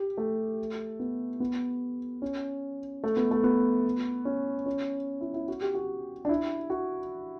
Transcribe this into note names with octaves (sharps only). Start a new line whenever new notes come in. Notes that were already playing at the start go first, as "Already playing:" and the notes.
Already playing: G4
A3
B3
B3
C#4
A3
B3
A3
B3
C#4
C#4
E4
E4
F#4
G4
F#4
D4
E4
F#4